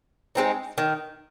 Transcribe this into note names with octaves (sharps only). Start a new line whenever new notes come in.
G#3 C4 D#4
D#3